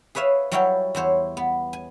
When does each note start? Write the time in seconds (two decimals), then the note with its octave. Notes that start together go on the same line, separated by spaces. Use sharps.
0.15 G#4 B4 C#5 E5 F5
0.51 F#3 G3 E4 C#5 F5 G5
0.95 E2 E4 C5 C#5
1.37 B3
1.73 G#5